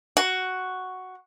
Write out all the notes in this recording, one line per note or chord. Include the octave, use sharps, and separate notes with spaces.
F#4